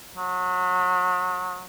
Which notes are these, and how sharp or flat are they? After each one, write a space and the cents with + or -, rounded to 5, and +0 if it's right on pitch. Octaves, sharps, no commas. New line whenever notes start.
F#3 -30